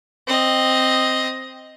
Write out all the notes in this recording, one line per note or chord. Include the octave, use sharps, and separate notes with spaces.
C4 D#5